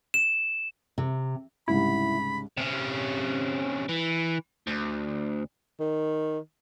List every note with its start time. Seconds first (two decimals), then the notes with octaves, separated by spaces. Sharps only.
0.14 E7
0.98 C3
1.68 C2 G#2 C#3 E4 B5
2.57 C3 C#4
3.89 E3
4.67 D2
5.80 D#3